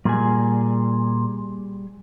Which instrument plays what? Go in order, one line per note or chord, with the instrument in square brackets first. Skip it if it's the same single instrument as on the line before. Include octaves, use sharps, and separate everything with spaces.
[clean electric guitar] A#2 [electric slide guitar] G3 G#4 G#5